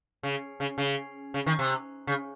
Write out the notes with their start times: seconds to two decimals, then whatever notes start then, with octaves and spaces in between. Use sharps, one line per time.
0.23 C#3
0.60 C#3
0.78 C#3
1.34 C#3
1.46 D#3
1.59 C3
2.07 C#3